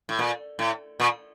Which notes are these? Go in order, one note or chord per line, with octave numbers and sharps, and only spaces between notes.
A2
A#2
A2
A#2